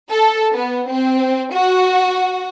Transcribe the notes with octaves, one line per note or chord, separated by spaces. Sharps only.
A4
B3
C4
F#4